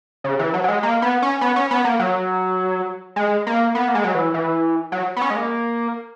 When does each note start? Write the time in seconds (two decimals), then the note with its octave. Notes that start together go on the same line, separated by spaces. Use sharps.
0.24 C#3
0.39 E3
0.54 F#3
0.64 F#3
0.68 G#3
0.83 A#3
1.02 B3
1.22 C#4
1.41 B3
1.56 C#4
1.71 B3
1.85 A#3
1.99 F#3
3.16 G#3
3.47 A#3
3.75 B3
3.88 A#3
3.95 G#3
4.04 F#3
4.15 E3
4.34 E3
4.92 F#3
5.16 B3
5.22 C#4
5.30 G#3
5.36 A#3